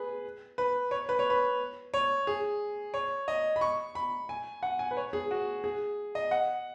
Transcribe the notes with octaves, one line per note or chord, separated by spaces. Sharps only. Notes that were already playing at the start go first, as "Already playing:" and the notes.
Already playing: G#4 B4
B4
C#5
B4
C#5
B4
C#5
G#4
C#5
D#5
B5
C#6
B5
G#5
F#5
G#5
B4
C#5
G#4
F#4
G#4
D#5
F#5